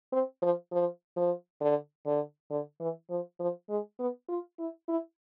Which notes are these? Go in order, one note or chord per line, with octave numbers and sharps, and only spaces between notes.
C4
F3
F3
F3
D3
D3
D3
E3
F3
F3
G#3
B3
F4
E4
E4